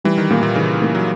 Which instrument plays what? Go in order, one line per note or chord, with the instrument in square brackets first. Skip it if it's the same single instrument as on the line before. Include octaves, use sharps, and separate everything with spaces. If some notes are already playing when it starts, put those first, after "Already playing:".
[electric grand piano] E3 [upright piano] G3
[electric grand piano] D#3
[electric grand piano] A#2 [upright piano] A#3
[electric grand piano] A#2
[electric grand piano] C#3 [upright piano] E3
[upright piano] A#3
[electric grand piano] F#3